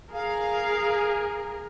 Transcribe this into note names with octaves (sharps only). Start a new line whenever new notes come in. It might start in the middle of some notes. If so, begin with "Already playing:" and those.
G#4 A#4 F5